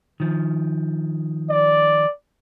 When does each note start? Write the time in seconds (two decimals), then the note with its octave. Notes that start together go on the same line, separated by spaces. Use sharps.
0.20 D#3 F3
1.50 D5